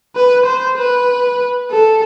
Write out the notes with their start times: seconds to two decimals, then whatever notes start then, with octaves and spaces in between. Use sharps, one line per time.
0.15 B4
0.46 C5
0.77 B4
1.71 A4